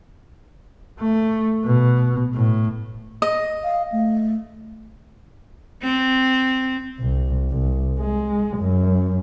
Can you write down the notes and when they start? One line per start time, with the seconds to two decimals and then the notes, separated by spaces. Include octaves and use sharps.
1.00 A3
1.65 B2
2.33 A2
3.22 D#5
3.64 F5
3.92 A3
5.82 C4
6.99 C2
7.50 C2
7.98 G#3
8.58 F#2